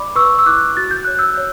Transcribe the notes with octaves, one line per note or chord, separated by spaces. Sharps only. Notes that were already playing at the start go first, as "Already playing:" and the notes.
Already playing: D5 B5 D6
B4 C#6 E6
E6
E4 D6 F#6
F#4 A6
G6
C#5 F#6
E6 G6
C#5